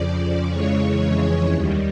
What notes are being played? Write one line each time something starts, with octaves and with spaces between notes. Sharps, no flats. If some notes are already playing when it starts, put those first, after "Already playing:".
Already playing: F2 C#3 F3 D5
F2 C#3 E3 G#3 C#5
D#2 D#3 G3